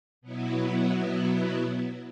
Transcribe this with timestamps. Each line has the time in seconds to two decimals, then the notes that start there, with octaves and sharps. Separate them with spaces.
0.21 B2 F#3 B3 E4